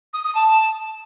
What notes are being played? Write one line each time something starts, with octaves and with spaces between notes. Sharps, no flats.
D#6
D#6
A5